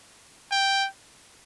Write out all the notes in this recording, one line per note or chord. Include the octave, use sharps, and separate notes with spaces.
G5